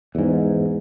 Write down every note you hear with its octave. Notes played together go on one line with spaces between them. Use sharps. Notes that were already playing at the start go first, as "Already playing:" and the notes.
E2 G#2